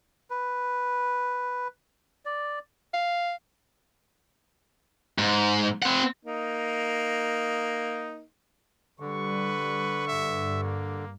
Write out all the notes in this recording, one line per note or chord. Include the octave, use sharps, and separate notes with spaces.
B4
D5
F5
G#2
C4 F#5
A#3 D#4
D3 G3 B4 C#6
G2 E5
A#3